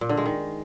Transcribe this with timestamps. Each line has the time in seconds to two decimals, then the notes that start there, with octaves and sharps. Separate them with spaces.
0.01 A#2
0.09 D3
0.17 G#3
0.26 D#3